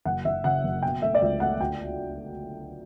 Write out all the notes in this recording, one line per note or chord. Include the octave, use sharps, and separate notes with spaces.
F#1 F#5
F#1 E5
C#3 F#5
F#1
B2 G5
A3 E5
D5
C#2 E5
A3 F#5
D2 G5